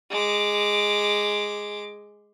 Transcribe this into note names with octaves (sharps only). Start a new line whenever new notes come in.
G#3 D6